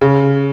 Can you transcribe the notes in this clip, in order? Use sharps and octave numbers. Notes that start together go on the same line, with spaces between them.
C#3